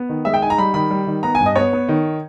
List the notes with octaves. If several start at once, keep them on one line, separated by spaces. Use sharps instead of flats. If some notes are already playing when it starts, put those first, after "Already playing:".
Already playing: B3
D#3
G#3 E5
G5
D#4 G#5
A#5
G3 B5
D#3 B5
G3
D#3
B3 A#5
G#5
G2
D#5
B3 C#5
B3
D#3